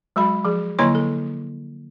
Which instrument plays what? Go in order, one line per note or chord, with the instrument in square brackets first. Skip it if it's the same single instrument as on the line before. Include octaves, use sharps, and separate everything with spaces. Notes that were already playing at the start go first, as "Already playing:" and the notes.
[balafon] F#3 G#3 F#4 B5
F3 G#4
D3 F#3 A#3 E4 C#5 C6
A4